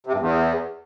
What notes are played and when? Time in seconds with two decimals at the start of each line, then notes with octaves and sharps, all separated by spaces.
0.07 C3
0.13 G2
0.19 E2